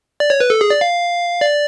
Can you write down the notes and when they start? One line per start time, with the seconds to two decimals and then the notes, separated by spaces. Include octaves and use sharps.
0.20 D5
0.30 C#5
0.40 B4
0.50 A4
0.61 G#4
0.70 D5
0.81 F5
1.41 D5